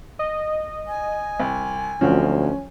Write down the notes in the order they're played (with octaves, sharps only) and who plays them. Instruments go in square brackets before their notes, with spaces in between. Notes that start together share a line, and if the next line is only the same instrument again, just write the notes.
[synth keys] D#5
[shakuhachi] G#5
[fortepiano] C2
[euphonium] D2 [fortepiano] F3 F#3 C4 [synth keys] C#4